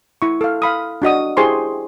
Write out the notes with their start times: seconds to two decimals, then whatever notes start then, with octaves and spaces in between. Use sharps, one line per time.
0.22 E4 C#6
0.41 A4 F5
0.62 F5 B5 D#6
1.02 D4 F#4 D#5 D#6
1.37 E4 G4 G#4 C5 C6 C#6